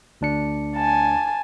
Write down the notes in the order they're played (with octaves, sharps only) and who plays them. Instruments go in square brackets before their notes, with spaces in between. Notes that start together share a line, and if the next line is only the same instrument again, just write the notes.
[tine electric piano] D2 D4 C#7
[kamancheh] G#5 A5